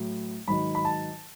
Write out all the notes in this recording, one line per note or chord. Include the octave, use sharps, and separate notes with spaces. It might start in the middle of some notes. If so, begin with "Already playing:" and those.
Already playing: A2 F#3
G#2 D#3 F#3 B5
B5
A5